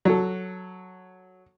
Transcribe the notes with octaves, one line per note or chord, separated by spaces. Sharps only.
F#3 A4